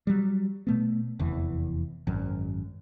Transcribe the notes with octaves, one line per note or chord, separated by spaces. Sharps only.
F#3 G3
B2 A3 B3
F1 E2 E3
G#1 F#2